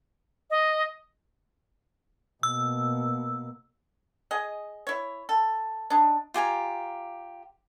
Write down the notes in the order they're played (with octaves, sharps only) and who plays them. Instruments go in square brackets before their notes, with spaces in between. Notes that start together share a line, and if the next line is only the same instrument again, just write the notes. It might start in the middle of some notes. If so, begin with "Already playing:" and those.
[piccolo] D#5
[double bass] B2 A#3 [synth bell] E6
[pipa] G#4 D#5
E4 C#5
A4
D4 D#4
[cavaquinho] F4 G4 G#5 A#5